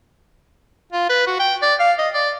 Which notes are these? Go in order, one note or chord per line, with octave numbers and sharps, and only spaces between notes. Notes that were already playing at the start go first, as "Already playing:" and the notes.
F4
B4
F#4
G5
D5
F5
D#5
D5